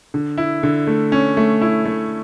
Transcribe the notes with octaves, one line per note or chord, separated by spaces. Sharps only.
D3
E4
D3
A3
C#4
A3
E4
A3